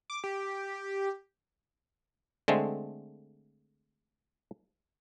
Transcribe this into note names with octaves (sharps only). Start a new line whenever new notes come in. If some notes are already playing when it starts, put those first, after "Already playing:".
D6
G4
D3 G#3 A3 C4